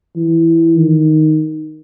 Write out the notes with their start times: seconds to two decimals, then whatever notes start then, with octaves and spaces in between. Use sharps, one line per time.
0.16 E3
0.77 D#3